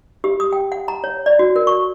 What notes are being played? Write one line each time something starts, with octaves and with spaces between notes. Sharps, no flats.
G4
D#6
G5
F#5
A#5
C#5
D5
F#4
A#4
C#6